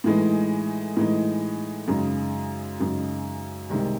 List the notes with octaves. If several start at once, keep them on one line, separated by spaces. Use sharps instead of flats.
A2 E3 G#3 D#4
A2 E3 G#3 D#4
F#2 C#3 G#3 D#4
F#2 C#3 G#3 D#4
C2 C3 D#3 G#3